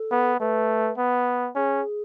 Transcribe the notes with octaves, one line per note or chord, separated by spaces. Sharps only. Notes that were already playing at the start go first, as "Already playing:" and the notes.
Already playing: A4
B3
A3 B4
B3
C#4 G#4